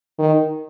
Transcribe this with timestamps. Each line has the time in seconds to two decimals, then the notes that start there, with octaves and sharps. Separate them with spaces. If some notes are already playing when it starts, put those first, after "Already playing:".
0.19 D#3